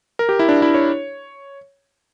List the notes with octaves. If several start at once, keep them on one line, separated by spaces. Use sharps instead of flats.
A#4
G4
E4
D4
E4
C#5